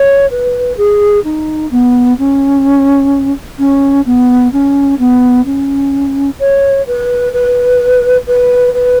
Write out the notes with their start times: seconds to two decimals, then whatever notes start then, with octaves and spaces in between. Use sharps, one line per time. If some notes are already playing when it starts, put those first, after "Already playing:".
Already playing: C#5
0.31 B4
0.78 G#4
1.24 D#4
1.71 B3
2.19 C#4
3.59 C#4
4.06 B3
4.53 C#4
4.99 B3
5.46 C#4
6.40 C#5
6.87 B4
7.33 B4
8.27 B4
8.74 B4